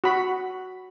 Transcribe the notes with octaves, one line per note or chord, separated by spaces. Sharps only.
F#4 B5